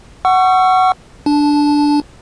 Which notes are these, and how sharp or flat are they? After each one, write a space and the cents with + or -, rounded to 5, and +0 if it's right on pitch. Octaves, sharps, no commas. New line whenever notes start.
F#5 +10 C#6 +0 E6 +40
D4 +0 A5 -15